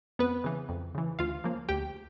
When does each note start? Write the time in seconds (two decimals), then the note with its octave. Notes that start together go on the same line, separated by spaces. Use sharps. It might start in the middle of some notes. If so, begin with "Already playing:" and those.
0.19 F2 B3 B4
0.44 C#3 E3
0.69 F2
0.95 C#3 E3
1.19 D2 F4 F5
1.44 C#3 F3 A#3
1.69 D2 G4 G5